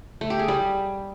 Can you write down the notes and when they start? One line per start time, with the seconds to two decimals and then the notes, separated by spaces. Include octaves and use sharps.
0.21 A3
0.30 G4
0.39 G#4
0.48 G3